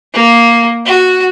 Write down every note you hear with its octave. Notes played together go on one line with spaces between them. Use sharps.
A#3
F#4